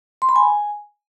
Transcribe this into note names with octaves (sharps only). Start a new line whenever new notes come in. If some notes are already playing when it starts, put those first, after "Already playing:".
C6
B5
G#5